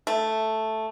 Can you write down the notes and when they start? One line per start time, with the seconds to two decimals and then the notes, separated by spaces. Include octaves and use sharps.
0.07 A3